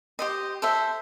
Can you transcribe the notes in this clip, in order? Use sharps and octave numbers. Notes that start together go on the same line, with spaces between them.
G4 C5 D#5
A4 C5 E5